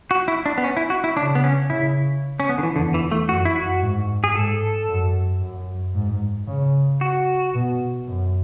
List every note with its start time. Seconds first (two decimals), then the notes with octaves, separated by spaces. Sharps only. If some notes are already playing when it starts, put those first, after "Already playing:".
0.11 F#4
0.28 E4
0.46 D4
0.58 B3
0.64 C#4
0.77 E4
0.90 F#4
1.04 E4
1.17 C#3 D4
1.35 B3
1.44 C#4
1.70 C#3 E4
2.40 C#4
2.49 B3
2.58 D3
2.63 E3
2.76 E2 D3
2.94 E3
3.12 A3
3.29 F#2 F#4
3.45 E4
3.56 F#4
3.82 G#2
4.24 G#4
4.35 G#2 A4
4.88 F#2
5.41 F#2
5.95 G#2
6.47 C#3
7.01 F#4
7.55 B2
8.08 F#2